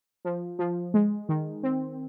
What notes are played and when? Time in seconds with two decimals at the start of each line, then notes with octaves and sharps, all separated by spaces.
0.25 F3
0.59 F3
0.94 G#3
1.29 D#3
1.63 C4